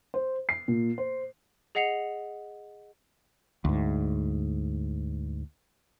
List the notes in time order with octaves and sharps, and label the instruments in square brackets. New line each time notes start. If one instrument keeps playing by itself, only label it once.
[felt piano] C5
C7
A#2
C5
[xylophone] G#4 D#5 F#5 C7 C#7 F7
[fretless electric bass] D2 G#2